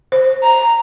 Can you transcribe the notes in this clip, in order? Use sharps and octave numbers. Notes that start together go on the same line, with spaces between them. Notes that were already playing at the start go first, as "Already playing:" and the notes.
C5
A#5